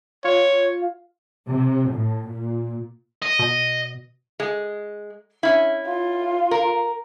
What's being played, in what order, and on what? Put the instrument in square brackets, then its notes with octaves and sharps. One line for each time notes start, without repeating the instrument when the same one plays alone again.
[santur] F4 [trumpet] C#5
[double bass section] C3
A2
A#2
[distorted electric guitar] D#5
[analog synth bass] B2
[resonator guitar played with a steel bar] G#3
C#4 E4
[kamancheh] F4
[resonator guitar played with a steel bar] A#4